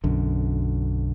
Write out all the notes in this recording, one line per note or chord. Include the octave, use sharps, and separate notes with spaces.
B1 F#2 D3